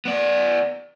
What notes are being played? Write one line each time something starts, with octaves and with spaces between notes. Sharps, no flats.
B3 D5